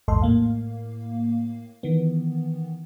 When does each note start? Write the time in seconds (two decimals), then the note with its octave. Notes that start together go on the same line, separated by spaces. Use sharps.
0.08 A#1 E2 G#2 A4 D#5 C6
0.22 A2 A#3 F5
1.83 D#3 E3 B3